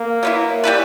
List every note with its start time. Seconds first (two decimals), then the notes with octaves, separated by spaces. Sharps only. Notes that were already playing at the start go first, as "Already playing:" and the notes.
Already playing: A#3
0.23 F#3 B3 E4
0.64 G3 C#4 E4 B4